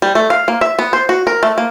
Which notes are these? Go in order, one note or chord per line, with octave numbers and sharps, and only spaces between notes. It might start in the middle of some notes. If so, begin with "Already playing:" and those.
G3
A3
F5
A#3
E5
B3
C5
F#4
A#4
A3
A#3